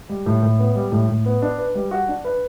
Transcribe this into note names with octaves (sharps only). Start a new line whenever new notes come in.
G3
A2
A2
B3
G3
A2
A2
B3
D4
B4
G3
F#4
D4
B4